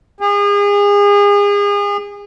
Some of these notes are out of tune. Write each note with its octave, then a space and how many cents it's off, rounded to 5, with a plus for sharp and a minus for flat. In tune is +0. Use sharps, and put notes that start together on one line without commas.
G#4 -35